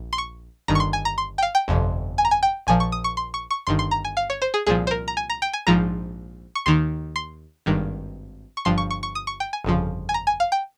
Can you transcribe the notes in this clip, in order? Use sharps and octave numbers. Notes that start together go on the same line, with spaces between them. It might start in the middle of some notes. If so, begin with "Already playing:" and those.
Already playing: A#1
C6
C#6
G1 G2 D#3 A#5
C#6
C6
G#5
A#5
C6
G5
F5
G5
G1 F2 C3
G#5
A#5
G#5
G5
A#1 A#2 F3 G#5
C#6
D#6
C#6
C6
C#6
C#6
G1 G2 D#3 C6
C6
A#5
G#5
F5
C#5
C5
G#4
C2 A#2 F3 G#4
C5
A#4
A#5
G#5
A#5
G5
G#5
A#1 G#2 F3 A#5
C#6
D#2 D#3 C6
C6
G#1 G2 D#3
C#6
G1 G2 F3 C6
C#6
C#6
C#6
D#6
C#6
G5
G#5
G1 F2 C#3 F3
G#5
A#5
G#5
F5
G5